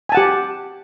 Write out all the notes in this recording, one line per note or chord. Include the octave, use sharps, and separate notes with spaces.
G4 F#5 G#5 A5